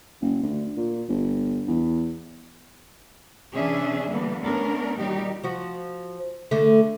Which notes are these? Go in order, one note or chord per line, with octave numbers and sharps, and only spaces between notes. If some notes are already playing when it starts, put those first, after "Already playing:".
F#1
D2
A#2
G1
E2
C3 E3 C#4 D4 G#4 E5
D3 E3 G3 A#3 B3
A3 B3 C#4 D4 A#4
A#2 D#3 F#3 G3 D#4 G4
F3 F#4
D3 A3